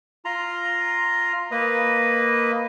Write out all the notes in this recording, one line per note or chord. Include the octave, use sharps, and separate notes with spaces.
F4 A#5 C6
A#3 B4 D#5